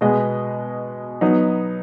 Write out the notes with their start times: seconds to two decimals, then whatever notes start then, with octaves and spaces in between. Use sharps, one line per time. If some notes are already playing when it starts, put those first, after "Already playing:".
0.01 B2 G#3 B3 G#4 D#5
1.21 F#3 B3 D#4